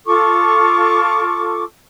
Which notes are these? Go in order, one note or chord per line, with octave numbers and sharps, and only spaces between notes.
F4 A4 C#6 D6